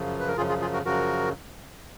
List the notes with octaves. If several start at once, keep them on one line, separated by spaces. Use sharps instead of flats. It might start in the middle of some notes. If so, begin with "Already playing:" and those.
Already playing: F#2 C#3 F3
B4
A#4
F#2 C#3 F3 F4 G#4
F4 G#4
F4 G#4
F#4 A#4
F#2 C#3 F3 F#4 A#4